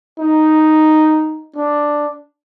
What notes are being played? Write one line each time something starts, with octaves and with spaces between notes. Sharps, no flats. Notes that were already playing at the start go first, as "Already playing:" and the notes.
D#4
D4